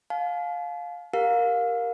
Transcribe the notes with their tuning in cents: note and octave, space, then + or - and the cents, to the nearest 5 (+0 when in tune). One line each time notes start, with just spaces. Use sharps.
F5 +20 A5 -45
G4 +15 A#4 +0 F5 +25